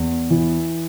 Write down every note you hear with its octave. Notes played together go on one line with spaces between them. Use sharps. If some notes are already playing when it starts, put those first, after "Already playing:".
Already playing: E2
E3